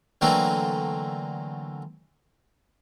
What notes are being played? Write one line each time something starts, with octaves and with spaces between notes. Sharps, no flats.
D3 E3 F#3 A3 A#3 C4